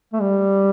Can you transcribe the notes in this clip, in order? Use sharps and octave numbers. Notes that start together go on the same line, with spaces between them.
A3
G3